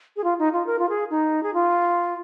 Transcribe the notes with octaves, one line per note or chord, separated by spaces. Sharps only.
G#4
F4
D#4
F4
A#4
F4
G#4
D#4
G#4
F4